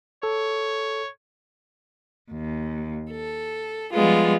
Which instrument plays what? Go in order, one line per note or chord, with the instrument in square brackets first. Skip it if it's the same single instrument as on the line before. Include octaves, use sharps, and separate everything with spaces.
[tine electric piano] A4 [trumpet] C#5
[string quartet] D#2
A4
F3 G3 G#3 B3 F4